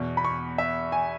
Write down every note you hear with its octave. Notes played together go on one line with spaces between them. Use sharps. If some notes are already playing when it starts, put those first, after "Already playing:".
Already playing: E2 B2
B5
C#6
E5
G#5